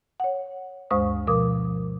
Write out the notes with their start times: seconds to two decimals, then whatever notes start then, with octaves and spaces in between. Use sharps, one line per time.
0.20 C#5 F#5
0.91 D2 G2 G#3 C5 C#6 D#6
1.27 B2 F3 A#4 D6 D#6